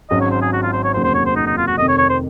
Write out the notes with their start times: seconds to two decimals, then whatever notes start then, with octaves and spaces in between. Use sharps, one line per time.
0.10 G#1 G#2 F#3 C#4 D#5
0.21 C#5
0.31 C5
0.42 G#4
0.53 F#4
0.63 F4
0.73 C5
0.84 C#5
0.93 F1 D#2 C#3 F#3 C5
1.04 C5
1.15 C#5
1.26 C5
1.36 D#4
1.47 D#4
1.57 F4
1.67 F#4
1.78 F1 F2 C3 D#3 D#5
1.88 C#5
1.98 C#5
2.10 C5